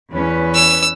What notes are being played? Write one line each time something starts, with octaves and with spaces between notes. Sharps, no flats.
E2 C#4 B4
E6